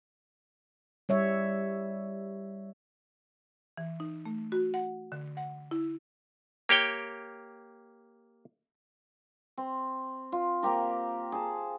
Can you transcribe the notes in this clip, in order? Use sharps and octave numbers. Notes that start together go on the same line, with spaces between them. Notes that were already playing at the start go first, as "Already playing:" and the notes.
G3 C#5 E5
E3
D#4
A3
F#4
F#5
D3
F#5
E4
A#3 G4 C#5 G5
C4
F4
A#3 C4 G4 A#4
G#4 A5